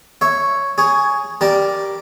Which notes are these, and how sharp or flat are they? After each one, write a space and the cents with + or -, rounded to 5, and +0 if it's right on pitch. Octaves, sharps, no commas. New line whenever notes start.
C#5 +0 E5 +0
G#4 +0 C#5 +10
G3 +0 A#4 +10 A5 +0